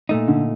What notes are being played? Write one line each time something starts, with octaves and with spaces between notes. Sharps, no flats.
A#2 A3 D#4
D3